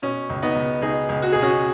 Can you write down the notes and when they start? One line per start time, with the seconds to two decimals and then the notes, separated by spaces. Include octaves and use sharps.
0.02 B2 C#4
0.30 C#2
0.42 B3 D#4
0.56 C#2
0.82 C#2 D#4 G#4
1.09 C#2
1.22 F#4
1.32 B2 G#4
1.42 C#4 F#4